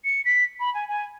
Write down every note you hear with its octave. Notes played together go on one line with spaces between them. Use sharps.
C#7
B6
B5
G#5
G#5